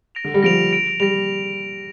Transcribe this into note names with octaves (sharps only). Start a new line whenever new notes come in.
A#6 D7 F7
D3
G3
F3 A#6 D7 F7
A#6 D7 F7
G3 A#6 D7 F7